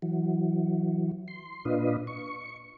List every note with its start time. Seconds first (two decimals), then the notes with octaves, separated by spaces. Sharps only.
0.02 E3 F#3
1.28 C6
1.65 A#2 D4 F4 B4 D#5
2.07 C#6